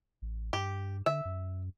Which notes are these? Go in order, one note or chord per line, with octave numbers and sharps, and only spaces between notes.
A1
G2 G4
D3 E5
F#2